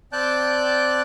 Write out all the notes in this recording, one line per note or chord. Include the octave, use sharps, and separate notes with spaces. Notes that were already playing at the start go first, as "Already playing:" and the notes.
C4 D5 G5 A5 F#6 G6